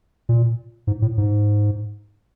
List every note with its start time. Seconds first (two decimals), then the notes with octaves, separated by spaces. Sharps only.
0.29 A#2
0.87 G#2
1.02 A2
1.18 G#2